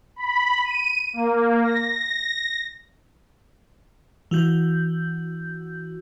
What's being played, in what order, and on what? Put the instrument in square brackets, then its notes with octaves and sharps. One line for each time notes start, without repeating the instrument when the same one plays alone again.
[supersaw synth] B5
D#7
A#3
A#6
[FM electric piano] E3 F#4 G6